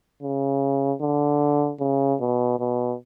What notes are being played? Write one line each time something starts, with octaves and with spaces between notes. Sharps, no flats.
C#3
D3
C#3
B2
B2